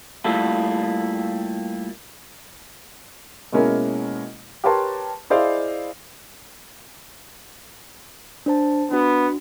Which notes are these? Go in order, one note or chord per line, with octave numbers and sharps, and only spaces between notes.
G3 A3 A#3 E4 F4 A4
B2 G#3 A#3 C#4 E4 A#4
G4 A#4 B4 C#5 A5 C6
E4 G#4 C5 D5 D#5 F5
D4 C5 A5
B3 D4 F#4